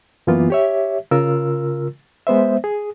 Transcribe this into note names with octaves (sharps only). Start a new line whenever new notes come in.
F#2 E3 A#3 B3 F4
G4 C#5 E5
C#3 F4 A#4 E6
G#3 B3 C5 E5
G#4